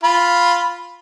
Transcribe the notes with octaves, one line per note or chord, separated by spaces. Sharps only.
F4 B5